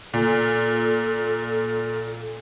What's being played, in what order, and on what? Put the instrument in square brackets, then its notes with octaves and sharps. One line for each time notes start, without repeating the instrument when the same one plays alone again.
[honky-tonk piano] A#2 [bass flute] A4